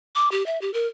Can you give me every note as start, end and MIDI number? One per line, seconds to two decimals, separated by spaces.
0.15 0.29 86
0.32 0.45 67
0.46 0.60 76
0.61 0.73 67
0.74 0.87 70